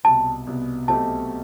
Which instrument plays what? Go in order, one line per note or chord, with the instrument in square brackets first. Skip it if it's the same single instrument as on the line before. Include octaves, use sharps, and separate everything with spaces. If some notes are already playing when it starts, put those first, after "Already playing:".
[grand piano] C2 B2 B3 [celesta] A5
[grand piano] C2 B2 B3
[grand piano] B1 B2 A3 C4 G4 [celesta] A5